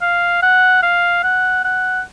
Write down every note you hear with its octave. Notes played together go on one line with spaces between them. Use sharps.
F5
F#5
F5
F#5
F#5